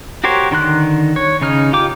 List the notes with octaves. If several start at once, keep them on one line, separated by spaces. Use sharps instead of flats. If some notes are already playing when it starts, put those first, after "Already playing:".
F#4 G4 A#4 C5 C#5
D3 D#3 C6 F#6
C#5
C#3 D#4 F6
F4 G4 G5 D6